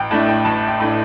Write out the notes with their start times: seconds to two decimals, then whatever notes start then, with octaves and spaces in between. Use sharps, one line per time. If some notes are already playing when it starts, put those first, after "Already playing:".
Already playing: A1 G5
0.11 A2 A3 D4 A5
0.28 G5
0.45 A1 A5
0.68 G5
0.80 A2 A3 D4